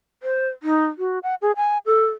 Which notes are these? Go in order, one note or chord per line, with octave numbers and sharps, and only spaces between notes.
C5
D#4
F#4
F#5
G#4
G#5
A4